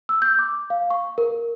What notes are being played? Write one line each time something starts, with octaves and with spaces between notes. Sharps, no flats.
E6
G6
D6
F5
C#6
A#4